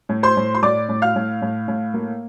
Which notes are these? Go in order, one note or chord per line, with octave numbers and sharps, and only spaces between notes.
A2
C5 C6
A2
C6
A2 D5 D6
A2
F5 F6
A2
A2
A2
A#3